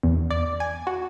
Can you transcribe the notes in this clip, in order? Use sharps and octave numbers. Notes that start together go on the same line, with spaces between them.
E2
D5
G#5
F#4